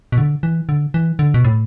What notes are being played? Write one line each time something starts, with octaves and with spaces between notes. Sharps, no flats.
B2
D3
E3
D3
E3
D3
B2
A2